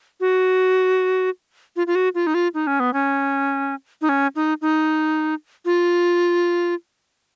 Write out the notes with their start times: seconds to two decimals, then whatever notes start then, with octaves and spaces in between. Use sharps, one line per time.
0.20 F#4
1.76 F4
1.87 F4
1.95 F#4
2.15 F4
2.27 D#4
2.34 F4
2.54 D#4
2.67 C#4
2.80 B3
2.93 C#4
4.01 D#4
4.09 C#4
4.36 D#4
4.62 D#4
5.65 F4